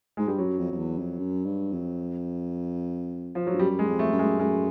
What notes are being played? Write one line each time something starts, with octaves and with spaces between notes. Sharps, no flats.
G#2 G#3
G2 G3
F#2 F#3
F2
F2
E2
F2
F#2
G2
F2
F3
F#3
G2
F#2 G3
G#3
F2
A3
F#2
G#3
F#2 G#3